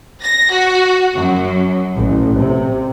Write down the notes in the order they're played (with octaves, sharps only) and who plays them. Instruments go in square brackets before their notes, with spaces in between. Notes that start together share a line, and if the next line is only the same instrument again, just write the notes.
[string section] A#6
F#4
F#2
A1
C3